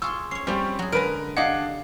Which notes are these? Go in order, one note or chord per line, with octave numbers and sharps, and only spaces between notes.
F4 G#4 C6 C#6 E6
C#4 C#5 C7
G3 C4 C#4 F4 G4
F#3 G#4
D3 G#3 A#4 B4 A#5 D7
D4 G4 D#5 F5 F#5 G#6